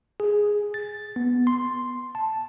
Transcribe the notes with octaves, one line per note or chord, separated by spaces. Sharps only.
G#4
A6
B3
C6
A5